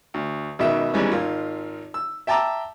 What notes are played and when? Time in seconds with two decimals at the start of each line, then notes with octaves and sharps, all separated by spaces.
0.14 D2
0.59 C#2 B2 D#3 E5
0.94 D#2 E3 G3 G#3 B3 C#4
1.11 G#1 D#3 F4
1.94 E6
2.27 E5 G5 A5 A#5 D6 E6